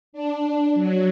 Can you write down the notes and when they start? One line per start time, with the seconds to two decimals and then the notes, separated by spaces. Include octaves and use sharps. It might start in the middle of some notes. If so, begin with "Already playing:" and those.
0.13 D4
0.74 F#3